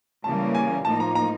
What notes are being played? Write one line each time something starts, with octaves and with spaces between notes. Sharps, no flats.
C#3 E3 G3 A#3 A5
G#5
A2 F3 A#3 D#4 A5
A#5
A#5